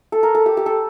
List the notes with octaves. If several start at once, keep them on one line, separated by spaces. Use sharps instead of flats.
A4
A#4
A4
G4
G4
A4